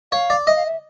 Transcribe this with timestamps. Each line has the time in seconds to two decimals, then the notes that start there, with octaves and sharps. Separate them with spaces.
0.12 C#5 F5
0.30 D5
0.46 D#5 E5
0.56 F5
0.66 E5